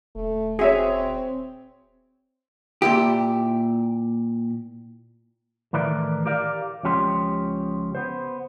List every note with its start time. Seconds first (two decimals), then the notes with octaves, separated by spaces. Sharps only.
0.15 D#1 A3
0.59 C4 F#4 G#4 C#5 E5
2.82 A#2 E4 G4
5.73 A2 D#3 E3 A#4 D5
6.26 G4 A#4 D5 F5
6.83 C#2 F3 C#4 G4 C#5 C6
7.95 B3 C5